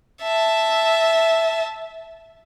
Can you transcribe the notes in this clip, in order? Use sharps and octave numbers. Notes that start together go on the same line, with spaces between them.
E5 A5